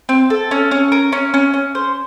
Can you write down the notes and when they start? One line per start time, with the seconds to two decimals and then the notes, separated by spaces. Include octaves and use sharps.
0.09 C4
0.30 A4
0.51 C#4
0.71 C#4
0.92 A#4
1.12 C#4
1.34 C#4
1.54 C#4
1.75 C5